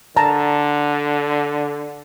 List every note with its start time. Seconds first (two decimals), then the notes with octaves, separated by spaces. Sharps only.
0.17 D3 A5 A#5